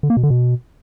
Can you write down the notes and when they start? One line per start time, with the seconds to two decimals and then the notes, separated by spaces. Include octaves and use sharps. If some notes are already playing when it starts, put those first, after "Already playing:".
0.03 D3
0.10 A#3
0.17 B2
0.23 D3
0.30 B2